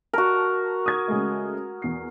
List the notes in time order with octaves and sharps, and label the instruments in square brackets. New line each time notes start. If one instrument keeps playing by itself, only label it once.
[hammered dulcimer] F#4 A#4 [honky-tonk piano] A5
[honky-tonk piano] D#6 G#6
C#3 G#3 A3
E2 C7